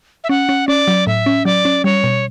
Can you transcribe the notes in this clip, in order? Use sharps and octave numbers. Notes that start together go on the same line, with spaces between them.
E5
C#4 F#5
C#4
C#4 D5
F#3
A2 E5
C#4
F#3 D5
C#4
G3 C#5
B2